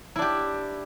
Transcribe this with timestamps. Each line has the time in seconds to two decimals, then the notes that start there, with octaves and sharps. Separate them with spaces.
0.16 E4
0.19 D4
0.22 G4